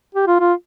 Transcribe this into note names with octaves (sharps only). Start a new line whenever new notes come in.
G4
F4
F4